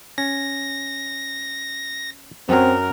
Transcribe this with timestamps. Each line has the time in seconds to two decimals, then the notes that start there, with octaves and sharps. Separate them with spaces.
0.18 C#4 A#6
2.49 F#2 F#3 C4 A#4